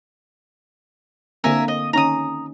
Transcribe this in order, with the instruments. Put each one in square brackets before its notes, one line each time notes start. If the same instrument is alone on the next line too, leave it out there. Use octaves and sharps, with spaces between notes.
[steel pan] D3 A#3 C4 [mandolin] A#4 E5 G#5
[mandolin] D#5
[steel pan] D#3 C#4 D#4 [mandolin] A#5 D#6